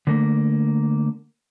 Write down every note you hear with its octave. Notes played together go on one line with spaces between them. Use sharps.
D3 A3 A#3